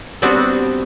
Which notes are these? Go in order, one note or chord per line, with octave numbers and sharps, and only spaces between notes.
G3 B3 C4 D4 F#4